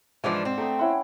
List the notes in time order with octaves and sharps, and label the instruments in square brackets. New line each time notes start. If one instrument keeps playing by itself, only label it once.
[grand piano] G#2 [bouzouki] E3 F3 D4 [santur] D5 F#5
[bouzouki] C4
[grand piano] A3 [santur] G5 A#5 D#6
[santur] C#4 E4 C6 [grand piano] F#5